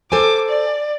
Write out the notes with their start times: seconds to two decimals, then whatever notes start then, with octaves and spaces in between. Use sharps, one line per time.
0.12 A4 C5 G#5 D6
0.49 D5